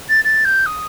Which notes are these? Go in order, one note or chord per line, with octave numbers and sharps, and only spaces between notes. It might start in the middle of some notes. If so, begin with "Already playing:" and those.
A6
A6
G6
D#6